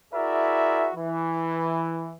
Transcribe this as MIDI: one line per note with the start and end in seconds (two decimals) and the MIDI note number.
0.13 0.89 64
0.13 0.89 66
0.13 0.89 68
0.13 0.89 70
0.13 0.89 74
0.13 0.89 76
0.95 2.16 52